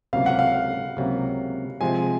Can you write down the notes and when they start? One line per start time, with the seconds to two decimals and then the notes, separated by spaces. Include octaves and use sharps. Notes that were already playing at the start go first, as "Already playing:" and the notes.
0.13 C#2 C3 F#3 A#3 F5
0.26 F#5
0.39 F5
0.97 C#2 C3 F#3 A#3
1.81 C3 F3 G#3 G#5